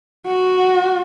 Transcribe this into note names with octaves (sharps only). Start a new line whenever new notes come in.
F#4